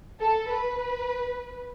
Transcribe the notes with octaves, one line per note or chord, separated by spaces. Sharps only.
A4
B4